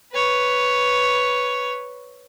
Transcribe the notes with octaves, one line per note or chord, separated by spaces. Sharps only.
B4 C#5